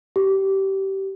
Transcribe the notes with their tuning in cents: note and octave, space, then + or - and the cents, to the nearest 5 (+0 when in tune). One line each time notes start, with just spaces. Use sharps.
G4 -20